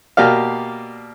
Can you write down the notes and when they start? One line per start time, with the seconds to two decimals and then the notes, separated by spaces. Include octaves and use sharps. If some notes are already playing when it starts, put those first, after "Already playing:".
0.17 B2 A#3 G4 D5 F5